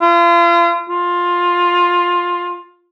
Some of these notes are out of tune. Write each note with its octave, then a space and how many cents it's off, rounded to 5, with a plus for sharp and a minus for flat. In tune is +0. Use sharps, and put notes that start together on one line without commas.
F4 -35
F4 +10